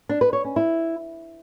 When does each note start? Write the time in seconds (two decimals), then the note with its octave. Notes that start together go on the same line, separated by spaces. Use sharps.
0.09 D4
0.21 B4
0.33 C#5
0.45 C#4
0.56 E4